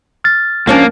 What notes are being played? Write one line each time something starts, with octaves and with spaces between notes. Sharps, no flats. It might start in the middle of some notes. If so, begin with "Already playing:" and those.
F6 A6
F3 A#3 C#4 D4